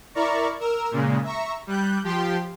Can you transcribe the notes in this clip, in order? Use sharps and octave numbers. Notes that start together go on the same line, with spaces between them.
E4 A#4 D5 A#5 C#6
A#4 E6
A#2 C#3 G#3
E5 A#5 C#6
G3 F#6 G6
F3 G4 G5 C6